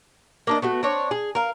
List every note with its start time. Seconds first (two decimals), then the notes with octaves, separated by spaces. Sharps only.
0.47 A#3 D4 D#5
0.62 A3 B3 F#4
0.83 C4 D4 C#5
1.11 G#4
1.35 A#4 F5